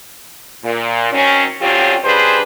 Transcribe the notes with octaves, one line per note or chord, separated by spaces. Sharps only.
A#2
D#3 F#3 C4 C#4
D3 F#3 C4 C#4 F4 G4
C#3 G3 D4 G#4 B4 C5